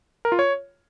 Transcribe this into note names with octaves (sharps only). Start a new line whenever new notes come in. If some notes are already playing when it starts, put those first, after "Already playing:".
A#4
F4
C#5